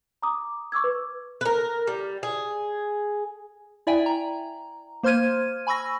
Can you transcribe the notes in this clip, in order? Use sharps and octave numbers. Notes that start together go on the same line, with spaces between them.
A#5 D6 D#6
C#6 D6 E6 G#6
B4
A#4 B4
G3
G#4
E4 D5 E5 G5 G#5
A#5
A#3 C5 C6 F6 G#6 D#7
G#5 B5 C#6 E6 A#6